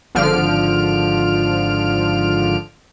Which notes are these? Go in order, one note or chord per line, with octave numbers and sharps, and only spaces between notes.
G#1 D3 F3 F6 D7